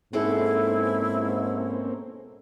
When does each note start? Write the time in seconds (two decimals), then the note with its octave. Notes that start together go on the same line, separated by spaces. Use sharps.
0.13 G#2 B2 A#3 C4 C#4 E4 G#4 A4